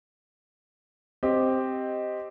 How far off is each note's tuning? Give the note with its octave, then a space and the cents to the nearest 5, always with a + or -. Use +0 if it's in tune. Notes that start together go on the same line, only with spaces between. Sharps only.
C4 +0 G4 +0 D#5 +0